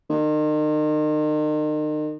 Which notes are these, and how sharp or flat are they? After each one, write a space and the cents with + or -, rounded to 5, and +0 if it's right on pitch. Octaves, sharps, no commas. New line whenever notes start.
D#3 -35